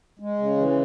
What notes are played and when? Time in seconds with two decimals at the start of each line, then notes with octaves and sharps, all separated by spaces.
0.20 G#3
0.39 C#3
0.57 E3